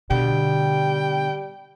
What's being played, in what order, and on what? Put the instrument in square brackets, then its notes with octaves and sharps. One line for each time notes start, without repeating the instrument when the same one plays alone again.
[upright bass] B2 D3 [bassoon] G3 [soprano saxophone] G5